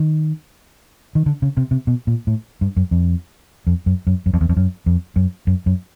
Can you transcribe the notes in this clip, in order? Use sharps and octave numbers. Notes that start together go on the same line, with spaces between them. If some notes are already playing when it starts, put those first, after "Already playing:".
Already playing: D#3
D#3
D3
C#3
C3
C3
B2
A#2
A2
G2
F#2
F2
F2
F#2
F#2
F#2
F2
E2
F2
F#2
F2
F#2
F#2
F#2